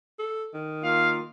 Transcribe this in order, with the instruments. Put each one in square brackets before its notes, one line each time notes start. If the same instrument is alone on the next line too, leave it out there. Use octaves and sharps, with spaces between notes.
[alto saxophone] A4
D#3
[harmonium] A#3 F4 [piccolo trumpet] F5